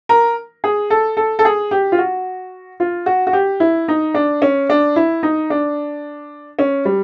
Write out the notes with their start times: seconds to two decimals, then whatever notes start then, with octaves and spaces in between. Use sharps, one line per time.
0.09 A#4
0.64 G#4
0.90 A4
1.17 A4
1.39 A4
1.45 G#4
1.71 G4
1.92 F4
1.98 F#4
2.80 F4
3.06 F#4
3.27 F#4
3.33 G4
3.60 E4
3.88 D#4
4.14 D4
4.42 C#4
4.69 D4
4.96 E4
5.23 D#4
5.50 D4
6.59 C#4
6.85 G3